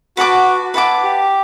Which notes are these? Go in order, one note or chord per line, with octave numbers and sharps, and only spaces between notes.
F#4 B4 F#5 A5 D6
E4 B4 F#5 A5 D6
G4